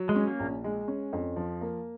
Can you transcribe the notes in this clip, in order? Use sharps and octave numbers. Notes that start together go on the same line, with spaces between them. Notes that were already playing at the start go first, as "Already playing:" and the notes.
Already playing: F#3
G#3
C#4
A#3
A#1
G#3
C#4
F2
F3
A#3